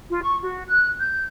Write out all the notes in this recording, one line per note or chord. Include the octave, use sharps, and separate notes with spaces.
F4
C#6
F#4
F#6
G6